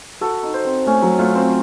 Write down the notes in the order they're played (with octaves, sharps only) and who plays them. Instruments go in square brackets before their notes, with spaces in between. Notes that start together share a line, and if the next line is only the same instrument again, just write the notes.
[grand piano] F#4 [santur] A4
[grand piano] D#4
[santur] C5
[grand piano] C4
[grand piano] A3 [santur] C#4
[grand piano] F#3
[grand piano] A3 [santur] F4
[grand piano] C4